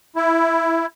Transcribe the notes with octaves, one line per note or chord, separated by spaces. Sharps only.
E4